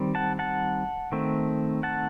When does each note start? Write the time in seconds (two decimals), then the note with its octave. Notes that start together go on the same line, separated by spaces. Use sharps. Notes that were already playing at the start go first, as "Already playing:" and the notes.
Already playing: D#3 G3 C4
0.15 F#5 A5
0.39 F#5 A5
1.12 D#3 A3 C4
1.83 F#5 A5